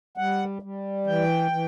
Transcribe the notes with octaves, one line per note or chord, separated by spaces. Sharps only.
G3 F#5
G3
E3 G5
E3